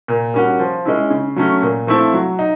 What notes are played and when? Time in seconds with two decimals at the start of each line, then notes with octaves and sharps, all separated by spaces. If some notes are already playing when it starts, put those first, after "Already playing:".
0.08 A#2
0.34 G3 A#3 C#4 F#4
0.60 F3
0.85 G#3 C#4 E4
1.10 C#3
1.36 F#3 A3 C#4
1.62 A#2
1.87 F3 A3 C4 E4
2.14 F#3
2.39 D#4